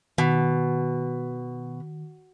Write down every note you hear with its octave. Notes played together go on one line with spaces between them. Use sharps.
B2 D#3